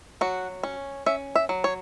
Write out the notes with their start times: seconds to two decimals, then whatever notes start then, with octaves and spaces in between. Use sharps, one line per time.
0.21 F#3 F#4
0.63 C#4
1.06 C#4 E5
1.36 E5
1.49 F#3
1.64 C#5